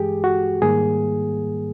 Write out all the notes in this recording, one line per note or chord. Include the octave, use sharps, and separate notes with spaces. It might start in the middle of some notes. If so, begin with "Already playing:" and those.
Already playing: G2 E3 G#3 G4 G#4
F#4
G#2 D#3 G3 A#3 G#4